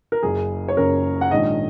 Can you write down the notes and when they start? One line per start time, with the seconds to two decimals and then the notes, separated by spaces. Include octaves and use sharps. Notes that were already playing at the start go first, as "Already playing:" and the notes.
0.12 A#4
0.23 F#1 F#2 C#3 G#4
0.68 C#5
0.77 F#1 F#2 C#3 A#4
1.21 F#5
1.31 A#1 G#2 D#3 D#5